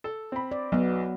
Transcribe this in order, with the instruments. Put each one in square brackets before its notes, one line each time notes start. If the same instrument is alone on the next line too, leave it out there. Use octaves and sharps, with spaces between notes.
[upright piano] A4
C4 B5
[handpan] D5
[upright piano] B1 [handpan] F#3 B3